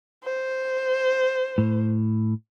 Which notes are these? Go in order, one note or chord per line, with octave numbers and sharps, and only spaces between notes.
C5
A2